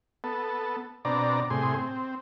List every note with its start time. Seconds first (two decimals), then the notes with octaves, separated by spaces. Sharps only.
0.24 B3 A4
1.05 B2 C4 D4 D5 A#5
1.50 A2 C3 G#4 C6
1.76 C4